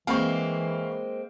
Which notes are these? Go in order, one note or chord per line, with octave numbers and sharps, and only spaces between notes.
E3 G#3 A#3 C4 F5 B5 C#6